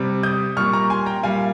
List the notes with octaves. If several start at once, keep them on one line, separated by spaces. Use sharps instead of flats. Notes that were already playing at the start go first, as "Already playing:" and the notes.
Already playing: C3 G3
D#6 G6
A#2 G3 C#6 F6
A#5 C#6
G#5 C6
G5 A#5
A#2 G3 F5 G#5